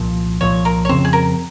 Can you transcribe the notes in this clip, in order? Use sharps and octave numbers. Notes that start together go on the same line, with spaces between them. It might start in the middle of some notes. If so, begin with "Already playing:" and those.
Already playing: C2 A#2 F3
C2 A#2 F3 C#5
A#4
C#5
F2 C#3 F3 C4 C5
G#4
A#4